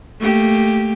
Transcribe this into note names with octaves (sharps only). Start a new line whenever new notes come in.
A3 A#3 G4